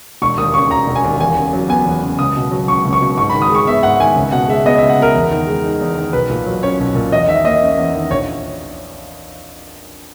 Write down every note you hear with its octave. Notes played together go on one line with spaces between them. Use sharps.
E1 C#6
D#2 D#6
C#3 C#6
E1 A#5
E1
G#5
D#2
E2 G#5
C#3
F#3
B3 G#5
E2
C#3
C#2 D#6
B2
F#3
C#2 C#6
C#2
C#6
B2
G#2 C#6
B5
D#3
D#6
G#3
C#6
B3 E5
G#2 F#5
D#3 G#5
C#2
B2 F#5
G#3 E5
B3 D#5
E5
C#2
F#5
B2 A#4
E2
D#3
G#3
D#4
E2
D#3
B1 B4
A#2
F#3
C#4 C#5
B1
A#2
E2 D#5
D#3 E5
A#3 D#5
C#4
E2
D#3
A#1 C#5